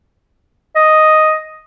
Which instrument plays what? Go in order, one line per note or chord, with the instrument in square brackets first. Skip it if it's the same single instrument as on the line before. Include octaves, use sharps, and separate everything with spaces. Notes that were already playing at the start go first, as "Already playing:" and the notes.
[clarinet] D#5